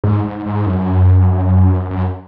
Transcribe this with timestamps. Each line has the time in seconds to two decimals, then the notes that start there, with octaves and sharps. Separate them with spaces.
0.04 G#2
0.25 G#2
0.46 G#2
0.66 F#2
1.91 F#2